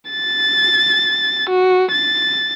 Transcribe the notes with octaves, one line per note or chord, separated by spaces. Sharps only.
A6
F#4
A6